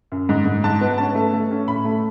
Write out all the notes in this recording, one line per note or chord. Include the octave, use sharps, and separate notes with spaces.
F#2
G#2
G#2
G#2 A5
B3
C#4 A5
A3
A3
C#4
A2 B5
A3